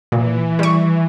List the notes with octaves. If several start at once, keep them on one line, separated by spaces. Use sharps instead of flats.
A#2 E3
G3 C#6